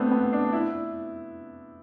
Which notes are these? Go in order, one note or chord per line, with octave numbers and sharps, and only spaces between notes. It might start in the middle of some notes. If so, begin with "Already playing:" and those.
Already playing: A3 B3 C4 D4
B3
D4
E4